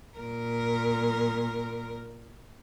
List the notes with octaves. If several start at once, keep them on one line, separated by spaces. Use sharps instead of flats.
A#2 A#4